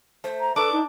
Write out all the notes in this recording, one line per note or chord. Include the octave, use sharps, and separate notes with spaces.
A3 C5
A#5
D4 A4 B4 D6
D#4